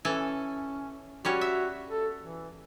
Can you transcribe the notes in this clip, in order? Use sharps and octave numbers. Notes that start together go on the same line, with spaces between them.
E3 C#4 A4 G#5
G3 C#4 F#4 C#5
E5
A4
E3